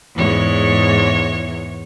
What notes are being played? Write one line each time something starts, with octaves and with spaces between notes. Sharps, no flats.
E2 G#2 C#5